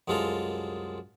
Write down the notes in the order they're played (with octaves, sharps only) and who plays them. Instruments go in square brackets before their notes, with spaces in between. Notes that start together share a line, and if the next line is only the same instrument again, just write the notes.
[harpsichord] C2 F#2 G#3 F4 A4 A#5